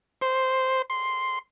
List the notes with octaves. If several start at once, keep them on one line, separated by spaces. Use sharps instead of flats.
C5
C6